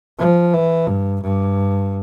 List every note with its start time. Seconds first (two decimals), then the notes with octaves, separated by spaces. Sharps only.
0.19 F3
0.53 E3
0.87 G2
1.22 G2